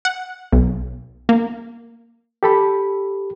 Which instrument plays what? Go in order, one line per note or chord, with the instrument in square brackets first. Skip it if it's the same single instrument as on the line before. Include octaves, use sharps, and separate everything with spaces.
[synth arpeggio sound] F#5
B1
A#3
[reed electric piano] G4 A4 B5